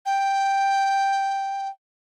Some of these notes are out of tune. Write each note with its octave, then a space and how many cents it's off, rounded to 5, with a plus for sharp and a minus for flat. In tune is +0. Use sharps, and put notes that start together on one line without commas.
G5 +0